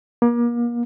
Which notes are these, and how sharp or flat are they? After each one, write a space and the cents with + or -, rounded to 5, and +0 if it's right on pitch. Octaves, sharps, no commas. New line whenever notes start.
A#3 +35